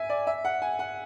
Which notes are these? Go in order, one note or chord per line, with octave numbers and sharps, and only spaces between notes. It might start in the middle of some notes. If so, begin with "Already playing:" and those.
Already playing: E5 G#5
D5
E5
F#5
G#5
F#5